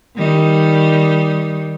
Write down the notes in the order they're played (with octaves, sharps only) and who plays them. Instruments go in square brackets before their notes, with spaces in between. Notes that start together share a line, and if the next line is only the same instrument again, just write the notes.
[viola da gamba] D#3 G3 D#4